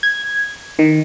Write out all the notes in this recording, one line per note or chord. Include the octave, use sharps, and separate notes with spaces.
G#6
D#3